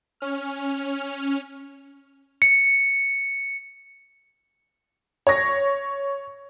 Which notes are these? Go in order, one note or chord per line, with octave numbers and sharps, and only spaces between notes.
C#4 F6
C#7
C#5 A#6